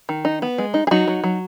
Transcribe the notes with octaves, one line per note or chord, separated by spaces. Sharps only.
D#3
D#4
B3
G#3
D#4
G#4
F#3 D#4 F#4
F#3
F#3